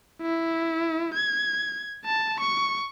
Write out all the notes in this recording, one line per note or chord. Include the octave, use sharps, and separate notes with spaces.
E4
G#6
A5
C#6